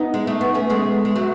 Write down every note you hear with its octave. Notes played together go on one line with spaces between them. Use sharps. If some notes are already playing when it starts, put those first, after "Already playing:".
Already playing: B3 D#4
G#3
A3
B3
A3 C#4
G#3 B3
G#3
F#3 A3